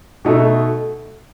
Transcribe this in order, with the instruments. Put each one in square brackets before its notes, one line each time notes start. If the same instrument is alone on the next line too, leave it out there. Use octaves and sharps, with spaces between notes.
[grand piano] B2 A3 D#4 F#4 A4